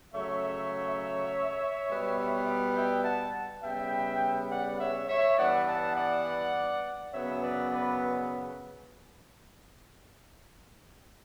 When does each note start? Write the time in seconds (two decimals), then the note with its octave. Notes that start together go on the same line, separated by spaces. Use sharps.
0.13 C#3 F#3 A3 C#5 E5
1.88 B2 G3 B3
2.75 E5 G5
3.05 F#5 A5
3.63 C#3 G3 B3 E5 G5
4.50 D5 F#5
4.80 C#5 E5
5.08 C#5 E5
5.38 G2 E3 B3 D5 F#5
5.67 F#5 A5
5.96 D5 F#5
7.12 F#2 C#3 F#3 B3 C#5 E5
7.42 B4 D5
7.71 B4 D5